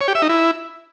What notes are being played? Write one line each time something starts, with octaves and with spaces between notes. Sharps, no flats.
C#5
G4
E5
D#4
E4